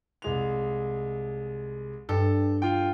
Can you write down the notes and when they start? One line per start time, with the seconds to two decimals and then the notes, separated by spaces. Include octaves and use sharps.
0.22 C2 G#3 F7
2.09 G2 A4
2.62 F4 G5